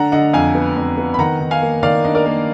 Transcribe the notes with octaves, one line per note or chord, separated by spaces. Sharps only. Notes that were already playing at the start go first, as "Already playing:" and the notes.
Already playing: D3 D4 F#5 A#5
D3 D#5 F#5
F2 F5 G#5
B3
F2
B3
B5
D#3 F#5 A#5
D#3
F5 G#5
A#3
D#3 D5 F5
D4 D#5
A#4 D5
A#3